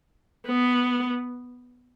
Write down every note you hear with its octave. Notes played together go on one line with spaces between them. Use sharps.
B3